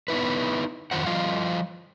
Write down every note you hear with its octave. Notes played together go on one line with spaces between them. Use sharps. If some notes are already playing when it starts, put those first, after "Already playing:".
B3 D#4 E4 B4
F2 D#3 F4 C5 F#5
F3 G3 F4 D#5 F5